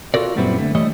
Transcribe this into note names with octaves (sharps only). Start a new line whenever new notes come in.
F4 F#4 A4 A#4 D5
F#2 A#2 G3 B3 C4 E4
D3 A3
E3 G3 A3 C#5 D#5